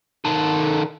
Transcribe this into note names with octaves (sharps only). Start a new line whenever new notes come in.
D#3 A4